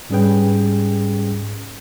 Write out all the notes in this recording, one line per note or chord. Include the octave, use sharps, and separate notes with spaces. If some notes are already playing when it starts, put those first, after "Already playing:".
G#2 G3 C#4 G#4 B4 G5